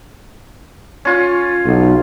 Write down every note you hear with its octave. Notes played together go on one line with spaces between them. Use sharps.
C#4 F4
B1